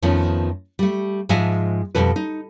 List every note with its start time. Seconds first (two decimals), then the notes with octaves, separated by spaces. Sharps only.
0.02 F2 D#3 F3 A3 B3 C#4
0.79 G3 A3
1.29 G#2 F3 G#3 D#5 E5 G#5
1.95 F2 B2 G3 A4 B4
2.16 D#4